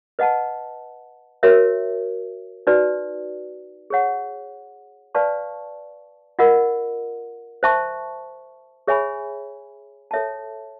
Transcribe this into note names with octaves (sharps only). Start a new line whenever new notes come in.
B4 D#5 F#5 A5
F#4 A#4 C#5 E5
D#4 F#4 B4 D5
G#4 C#5 F#5
B4 D5 F5 A5 C#6
F4 A#4 D#5 F#5
C5 E5 A5 C#6
G#4 C#5 E5 G#5 B5
A4 C#5 E5 A5